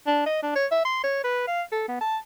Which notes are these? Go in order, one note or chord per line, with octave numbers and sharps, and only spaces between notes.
D4
D#5
D4
C#5
E5
C6
C#5
B4
F5
A4
B3
A5